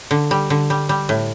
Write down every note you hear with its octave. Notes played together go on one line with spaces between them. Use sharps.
D3
G3
D3
G3
G3
A2